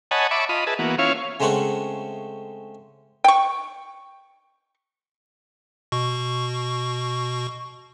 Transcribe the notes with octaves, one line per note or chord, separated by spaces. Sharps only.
C#5 D#5 F#5 G#5 A5 B5
E5 A5 B5 C#6 D6
F4 D#5 B5
G#4 B4 E5 A5
E3 A#3 B3 F#4
C#4 E4 F4 C#5 F5
C#3 G#3 A3 C4 F#5 C#6
G5 C#6
B2 C#6